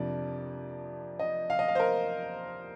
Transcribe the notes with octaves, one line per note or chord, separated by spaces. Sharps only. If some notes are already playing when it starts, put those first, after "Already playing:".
Already playing: F2 C3 F3 A#3 D4 D5
D#5
F5
D#5
F5
C5
A#4